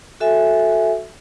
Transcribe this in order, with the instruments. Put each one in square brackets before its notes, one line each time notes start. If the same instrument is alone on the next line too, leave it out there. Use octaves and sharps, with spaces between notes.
[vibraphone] F#4 A4 E5 G#5